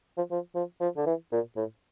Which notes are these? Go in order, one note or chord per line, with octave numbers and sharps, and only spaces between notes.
F3
F3
F3
F3
D3
E3
A#2
A2